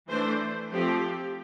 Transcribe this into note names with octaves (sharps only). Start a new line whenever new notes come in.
E3 A3 D4 C5
F3 A3 C4 G4